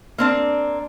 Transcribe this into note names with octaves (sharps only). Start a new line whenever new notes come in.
A#3 C4 D4